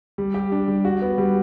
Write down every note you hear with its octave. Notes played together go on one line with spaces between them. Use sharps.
G3
G4
D4
G3
F#4
B3
G3